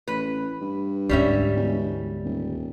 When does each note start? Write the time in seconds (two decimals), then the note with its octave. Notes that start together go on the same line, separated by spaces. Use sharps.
0.08 A1 B4
0.61 G2
1.09 D2 G#2 G3 C#4 E5
1.55 E1
2.24 D#1